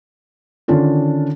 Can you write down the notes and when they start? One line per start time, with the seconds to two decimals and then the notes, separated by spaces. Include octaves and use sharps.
0.68 D3 D#3 C#4 D4 F4